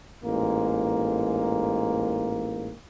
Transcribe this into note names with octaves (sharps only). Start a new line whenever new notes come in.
A1 G#2 A#3